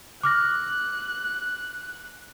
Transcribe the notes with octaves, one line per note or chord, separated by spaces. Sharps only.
D6 F6 F#6 A#6